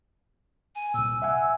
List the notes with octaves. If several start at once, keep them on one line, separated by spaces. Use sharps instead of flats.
G#5
C2 A#2 E6
E5 F#5 G#5